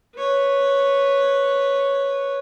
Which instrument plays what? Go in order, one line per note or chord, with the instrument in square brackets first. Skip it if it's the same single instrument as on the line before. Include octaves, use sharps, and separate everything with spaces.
[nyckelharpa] B4 C#5